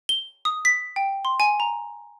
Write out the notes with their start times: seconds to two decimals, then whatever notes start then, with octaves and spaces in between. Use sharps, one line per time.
0.09 G7
0.45 D#6
0.65 B6
0.96 G5
1.25 C6
1.40 G#5
1.60 A#5